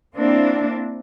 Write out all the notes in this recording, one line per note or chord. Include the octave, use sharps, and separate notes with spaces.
A#3 C4 D4 E4